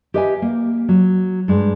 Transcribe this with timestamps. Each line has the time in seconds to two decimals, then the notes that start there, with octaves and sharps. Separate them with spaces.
0.14 G4 B4 D#5 E5 G5 G#5
0.42 A#3
0.89 F#3
1.48 G2 G#3